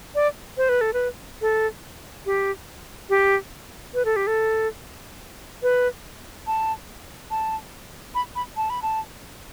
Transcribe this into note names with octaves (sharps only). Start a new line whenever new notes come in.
D5
C5
B4
A4
B4
A4
G4
G4
B4
A4
G4
A4
B4
A5
A5
B5
B5
A5
B5
A5